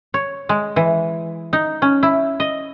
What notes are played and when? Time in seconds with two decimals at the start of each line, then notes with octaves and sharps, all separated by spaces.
0.14 C#5
0.49 G#3
0.76 E3
1.53 D#4
1.82 C#4
2.03 E4
2.40 D#5